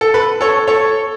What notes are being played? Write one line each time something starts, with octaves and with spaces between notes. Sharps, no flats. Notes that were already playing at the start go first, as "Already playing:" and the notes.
A4
B4
A4 C#5
A4 C#5